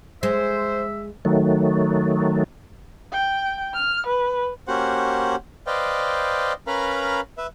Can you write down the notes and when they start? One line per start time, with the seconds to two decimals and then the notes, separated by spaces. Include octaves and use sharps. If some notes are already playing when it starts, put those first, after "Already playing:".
0.23 G#3 C5 E5
1.25 D#3 F#3 A3
3.13 G5
3.75 F6
4.06 B4
4.67 A#3 C#4 F#4 G4 C5 F#5
5.67 B4 C5 D5 D#5 F5 G5
6.67 C#4 A#4 B4 F5 A#5 B5
7.38 B4 E5